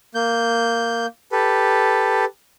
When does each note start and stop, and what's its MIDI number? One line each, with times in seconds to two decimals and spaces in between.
0.15 1.06 58
0.15 1.06 91
1.32 2.25 67
1.32 2.25 69
1.32 2.25 71